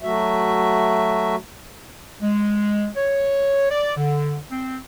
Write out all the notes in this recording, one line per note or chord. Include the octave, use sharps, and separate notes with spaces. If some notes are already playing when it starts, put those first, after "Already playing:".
F#3 A3 F#4 E5
G#3
C#5
D5
D3
C4